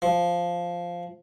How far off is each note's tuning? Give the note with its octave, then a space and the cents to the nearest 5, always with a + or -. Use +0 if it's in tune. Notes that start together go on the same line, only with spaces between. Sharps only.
F3 -5